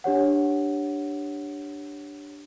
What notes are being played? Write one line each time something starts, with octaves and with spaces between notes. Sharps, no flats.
D4 G4 C#5 F#5